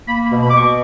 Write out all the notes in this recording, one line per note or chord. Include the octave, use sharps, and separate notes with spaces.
A#3 B5
B5
B2
B5
D6
B2 C#6